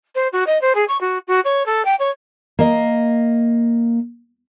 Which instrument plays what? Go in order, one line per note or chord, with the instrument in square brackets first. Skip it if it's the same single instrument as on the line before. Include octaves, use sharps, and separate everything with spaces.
[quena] C5
F#4
D#5
C5
G#4
C#6
F#4
F#4
C#5
A4
G5
C#5
[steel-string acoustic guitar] A#3 D#5